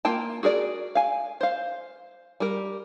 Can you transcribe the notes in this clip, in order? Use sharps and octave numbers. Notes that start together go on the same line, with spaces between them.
A#3 F4 A#4 G5 A5
F#4 G#4 A#4 D5
F5 G#5
C5 F5
G3 A#4